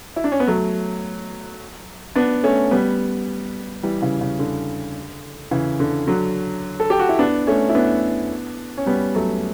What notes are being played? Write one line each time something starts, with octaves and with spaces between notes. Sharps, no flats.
E4
D4
C#4
B3
F#3 A3
B3 D4
A3 C#4
G3 B3
E3 G3
C#3 E3
C#3
D3
C#3 E3
D3
D3 F#3
A4
G4
F#4
E4
B3 D4
A3 C#4
E4
B3 D4
C#4
G3 B3
F#3 A3